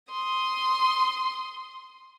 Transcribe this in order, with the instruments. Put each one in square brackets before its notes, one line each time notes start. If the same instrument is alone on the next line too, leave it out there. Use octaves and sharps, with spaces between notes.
[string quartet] C6 D#6